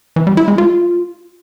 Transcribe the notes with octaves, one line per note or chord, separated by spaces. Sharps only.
E3
G3
E4
G#3
F4